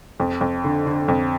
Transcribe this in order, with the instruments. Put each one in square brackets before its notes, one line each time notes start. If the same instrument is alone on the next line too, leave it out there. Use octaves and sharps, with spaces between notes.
[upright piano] F2
F2
D3
D3
F2